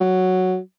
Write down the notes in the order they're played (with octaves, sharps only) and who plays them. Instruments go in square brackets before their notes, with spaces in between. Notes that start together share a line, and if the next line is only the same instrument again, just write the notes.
[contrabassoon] F#3